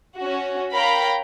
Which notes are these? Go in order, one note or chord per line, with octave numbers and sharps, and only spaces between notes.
C#4 F#4
A#4 C#5 F5 G5 A#5 B5